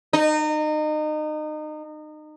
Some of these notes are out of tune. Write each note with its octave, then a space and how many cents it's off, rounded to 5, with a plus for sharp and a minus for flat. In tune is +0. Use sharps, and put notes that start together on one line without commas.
D#4 -30